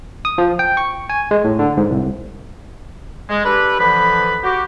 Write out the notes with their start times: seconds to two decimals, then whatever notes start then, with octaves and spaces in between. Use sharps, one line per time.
0.25 D#6
0.38 F3
0.59 G5
0.77 C#6
1.10 G#5
1.31 G#3
1.44 A2
1.59 D3
1.77 G#2
1.90 C2
3.29 G#3
3.45 D4 G4 A4 B4
3.79 D3 E3 F3 B4 B5
4.43 F#4 G4